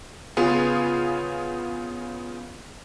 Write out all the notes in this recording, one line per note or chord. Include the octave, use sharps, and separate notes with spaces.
C#3 B3 F4 G#4